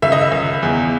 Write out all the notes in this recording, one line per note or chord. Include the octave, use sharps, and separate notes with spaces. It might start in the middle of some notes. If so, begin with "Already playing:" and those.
C#2 E5
D#5
E5
C#2
E2